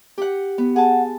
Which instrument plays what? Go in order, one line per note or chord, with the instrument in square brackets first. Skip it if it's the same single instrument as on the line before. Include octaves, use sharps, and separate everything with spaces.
[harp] G4 F#5
B3
[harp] G#4 A5 [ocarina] F#5